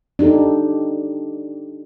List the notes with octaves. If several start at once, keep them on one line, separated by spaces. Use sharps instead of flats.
D4 D#4 G4 A4